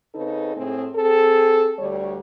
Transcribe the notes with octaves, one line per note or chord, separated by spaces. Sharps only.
C#3 C4 D#4 A4 B4
A2 A3 C4 G#4
C4 G#4 A4
D2 D3 G3 C#5